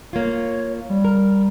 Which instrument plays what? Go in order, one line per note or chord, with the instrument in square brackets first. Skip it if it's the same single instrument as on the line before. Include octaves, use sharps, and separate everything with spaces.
[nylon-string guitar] A#3 F4 [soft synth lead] C#5
[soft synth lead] G3
[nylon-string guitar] A#4